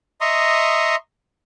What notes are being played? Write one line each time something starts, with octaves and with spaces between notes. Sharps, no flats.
D#5 E5 A#5 C6 C#6 D#6